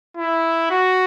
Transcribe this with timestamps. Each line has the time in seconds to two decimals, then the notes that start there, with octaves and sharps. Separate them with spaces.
0.17 E4
0.71 F#4